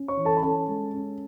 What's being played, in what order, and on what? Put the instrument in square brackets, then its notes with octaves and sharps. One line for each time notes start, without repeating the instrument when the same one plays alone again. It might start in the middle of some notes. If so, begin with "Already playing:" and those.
Already playing: [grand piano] C#4
C#5 C#6
E3
A4 A5
B5
C#4 A4 A5
G#3
C#4